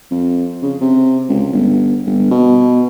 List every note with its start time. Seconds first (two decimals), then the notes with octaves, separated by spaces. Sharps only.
0.11 F2
0.62 C#3
0.81 C3
1.29 C#2
1.52 G1
2.06 G1
2.31 B2